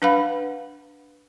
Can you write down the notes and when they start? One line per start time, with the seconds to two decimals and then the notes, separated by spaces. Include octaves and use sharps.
0.02 D4 B4 F5 F#5 B5